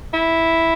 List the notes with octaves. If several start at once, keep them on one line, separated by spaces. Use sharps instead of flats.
E4